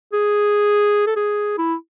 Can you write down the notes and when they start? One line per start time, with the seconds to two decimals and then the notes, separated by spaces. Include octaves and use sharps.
0.12 G#4
1.07 A4
1.16 G#4
1.58 E4